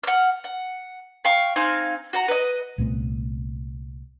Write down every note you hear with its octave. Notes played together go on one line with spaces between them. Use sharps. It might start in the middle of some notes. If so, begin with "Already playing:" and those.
F#5 F6
F#5
F5 G5 C#6
C4 D#4 F5 G#5
F#4 F#5 A#5
B4 D#5
C2 A#2 A3 B3